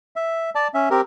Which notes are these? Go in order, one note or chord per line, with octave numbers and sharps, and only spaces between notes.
E5
D5 A5
C#4 E5
C4 G4 A#4